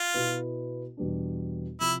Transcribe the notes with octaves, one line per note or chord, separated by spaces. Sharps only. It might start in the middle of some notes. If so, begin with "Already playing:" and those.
Already playing: F4
B2 B3 E4 B4
E2 B2 G3 B3 D4
C3 F3 E4